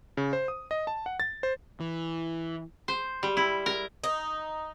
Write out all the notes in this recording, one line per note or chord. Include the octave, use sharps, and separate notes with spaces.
C#3
C5
D#6
D#5
A5
F#5
A6
C5
E3
C5
G3
E4
A#4
D#4